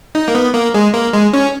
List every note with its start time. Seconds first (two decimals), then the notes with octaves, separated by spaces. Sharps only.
0.15 D#4
0.28 A#3
0.35 B3
0.54 A#3
0.74 G#3
0.94 A#3
1.13 G#3
1.33 C#4